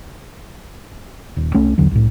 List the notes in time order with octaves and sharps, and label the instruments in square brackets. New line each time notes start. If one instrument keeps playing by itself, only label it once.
[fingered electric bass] D#1
C2 A3 C#4
A#1 E2 D3 F#3
C2 A2